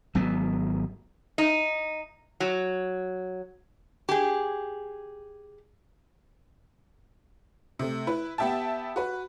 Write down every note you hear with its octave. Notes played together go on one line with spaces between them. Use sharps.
G#1 F#3 B3
D#4
F#3
G4 G#4
C3 A3
E4 B4
B3 G4 E5 G5 A5
F#4 B4